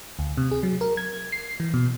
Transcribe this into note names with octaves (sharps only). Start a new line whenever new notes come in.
D2
C3
G#4
F#3
A#4
G#6
C7
E3
B2